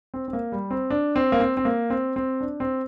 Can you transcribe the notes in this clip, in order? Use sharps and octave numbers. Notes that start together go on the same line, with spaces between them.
C4
C4
A#3
G3
C4
D4
C4
A#3
C4
C4
A#3
C4
C4
D4
C4